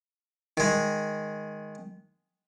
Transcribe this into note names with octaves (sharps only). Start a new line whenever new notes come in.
D#3 G#3